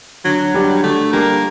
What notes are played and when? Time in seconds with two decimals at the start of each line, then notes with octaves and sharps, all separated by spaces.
0.25 D3 F#3
0.54 G3 D4 G4
0.84 D3 A3
1.13 G3 A#3 D4 G4